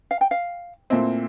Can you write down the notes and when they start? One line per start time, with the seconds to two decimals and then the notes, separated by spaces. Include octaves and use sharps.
0.11 F5
0.21 G5
0.31 F5
0.90 A#2 A3 C4 E4